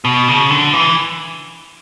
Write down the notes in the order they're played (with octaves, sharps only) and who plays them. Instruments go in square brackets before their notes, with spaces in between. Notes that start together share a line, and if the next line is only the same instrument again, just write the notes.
[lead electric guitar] B2
C#3
D3
E3